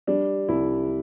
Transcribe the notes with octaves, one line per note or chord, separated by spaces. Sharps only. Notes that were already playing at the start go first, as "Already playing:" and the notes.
G3 D4
C2 E4